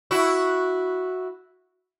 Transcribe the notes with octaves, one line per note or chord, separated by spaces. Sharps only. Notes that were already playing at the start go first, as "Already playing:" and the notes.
E4 F#4